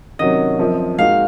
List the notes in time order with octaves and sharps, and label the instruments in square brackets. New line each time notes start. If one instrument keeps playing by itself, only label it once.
[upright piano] C3 D#3 F#3 C#4 F#4 [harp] D#5
[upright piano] F#2 F3 C4
[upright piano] A#2 G#3 D#4 F#4 [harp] F5